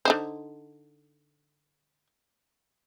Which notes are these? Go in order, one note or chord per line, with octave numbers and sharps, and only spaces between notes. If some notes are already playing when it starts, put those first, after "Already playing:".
D3 D#4 C5